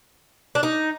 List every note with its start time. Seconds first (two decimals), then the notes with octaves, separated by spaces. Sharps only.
0.55 D4
0.63 D#4